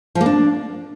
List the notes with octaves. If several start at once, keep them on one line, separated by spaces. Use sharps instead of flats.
F3
A#3
D4